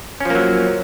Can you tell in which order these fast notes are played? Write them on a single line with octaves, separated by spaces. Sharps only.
C#4 F3 A#3 F#3